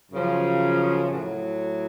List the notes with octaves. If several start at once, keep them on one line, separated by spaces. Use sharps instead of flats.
F#2 C#3 F3
A2 F#3